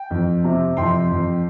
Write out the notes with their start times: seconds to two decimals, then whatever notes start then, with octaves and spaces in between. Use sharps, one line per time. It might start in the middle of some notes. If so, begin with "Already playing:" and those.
Already playing: G5
0.11 F2
0.44 C3
0.77 F2 G5 C6
1.11 F2